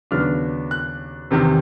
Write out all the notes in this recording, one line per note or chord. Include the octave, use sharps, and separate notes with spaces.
D#2 C#3 F#3 B3 D4 F6
F#6
E2 C3 D#3